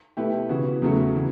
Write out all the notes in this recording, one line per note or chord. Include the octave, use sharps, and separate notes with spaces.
B2 A3 E4 G4 B4
C#3 E3 B3 F#4
E2 C#3 F#3 A3 C#4
C#3 E3